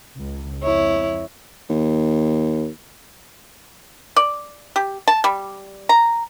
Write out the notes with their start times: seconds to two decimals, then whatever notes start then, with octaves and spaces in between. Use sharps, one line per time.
0.18 C#2
0.63 F2 E4 C#5
1.70 D#2
4.16 D5
4.76 G4
5.08 A5
5.24 G3
5.89 A#5